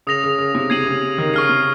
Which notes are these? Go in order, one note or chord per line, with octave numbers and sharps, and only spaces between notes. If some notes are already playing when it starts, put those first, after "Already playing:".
C#3 D#6 A#6 F7
C#3
C#3
C3
C3 G#6 C7 D#7 F#7
C#3
D#3
C#3 C#6 F6 C7
C3